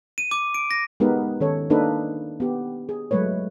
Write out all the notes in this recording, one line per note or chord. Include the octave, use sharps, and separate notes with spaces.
D#7
D6
D7
A#6
G#3 B3 D#4 G4 A#4 B4
D#3 C#4 A4 C#5
A#3 D4 D#4 A4 B4
B3 G4
G#4
F#3 G#3 A3 B4 C#5